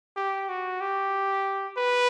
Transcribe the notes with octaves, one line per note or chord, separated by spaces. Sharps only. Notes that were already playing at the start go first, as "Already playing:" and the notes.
G4
F#4
G4
B4